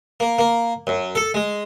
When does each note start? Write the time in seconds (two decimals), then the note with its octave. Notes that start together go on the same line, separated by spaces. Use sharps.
0.20 A#3
0.39 A#3
0.87 F#2
1.15 A4
1.34 G#3